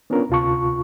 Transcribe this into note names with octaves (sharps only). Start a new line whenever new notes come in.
B3 C#4 D4 F4 A#4
D2 C3 F4 A5 C#6